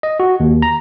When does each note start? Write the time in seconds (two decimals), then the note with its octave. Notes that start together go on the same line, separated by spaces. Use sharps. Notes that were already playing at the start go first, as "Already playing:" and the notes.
0.03 D#5
0.20 F#4
0.40 D#2
0.62 A#5